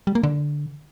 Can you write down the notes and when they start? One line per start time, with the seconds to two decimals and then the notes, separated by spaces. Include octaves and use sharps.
0.07 G3
0.15 A#3
0.23 D3